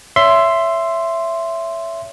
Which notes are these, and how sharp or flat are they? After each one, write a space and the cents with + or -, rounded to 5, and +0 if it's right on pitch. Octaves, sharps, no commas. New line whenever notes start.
C#5 +25 E5 +15 C6 +0